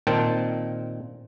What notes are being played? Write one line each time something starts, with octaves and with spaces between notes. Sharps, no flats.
A#2 D#3 C4 G5 A5